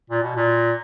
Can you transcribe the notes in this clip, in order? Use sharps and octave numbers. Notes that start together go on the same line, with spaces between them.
A#2
B2
A#2